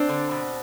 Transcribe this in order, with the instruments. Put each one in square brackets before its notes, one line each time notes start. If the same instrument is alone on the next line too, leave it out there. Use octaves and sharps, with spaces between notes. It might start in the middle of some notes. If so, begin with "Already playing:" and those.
Already playing: [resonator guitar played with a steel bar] C4 D4
D3
B2